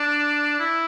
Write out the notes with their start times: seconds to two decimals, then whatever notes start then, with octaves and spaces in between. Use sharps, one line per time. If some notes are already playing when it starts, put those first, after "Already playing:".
Already playing: D4
0.60 E4